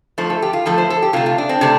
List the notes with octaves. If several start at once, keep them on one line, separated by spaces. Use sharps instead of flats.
F2 F3 A3 C5
A4
G4
F4
F2 F3 A3 A4
C5
A4
G4
C3 A3 F4
F4
D4
C4
C3 A3 D4